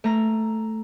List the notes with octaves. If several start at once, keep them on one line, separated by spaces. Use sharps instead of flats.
A3 A#5